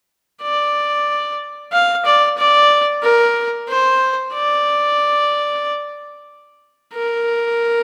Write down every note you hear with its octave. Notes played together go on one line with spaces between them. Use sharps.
D5
F5
D5
D5
A#4
C5
D5
A#4